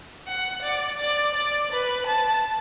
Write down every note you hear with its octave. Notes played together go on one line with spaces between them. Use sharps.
F#5
D5
D5
D5
B4
A5